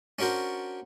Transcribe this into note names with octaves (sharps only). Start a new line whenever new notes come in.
C#4 D4 F#4 A#4 C5